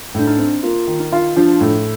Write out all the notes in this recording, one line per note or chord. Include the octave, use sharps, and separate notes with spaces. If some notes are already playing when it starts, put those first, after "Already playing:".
A2 D4
D#4
C4
A#3 F4
D#3
D#4
F4
F3 D4
A2